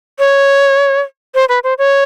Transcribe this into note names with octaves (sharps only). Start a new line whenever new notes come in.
C#5
C5
B4
C5
C#5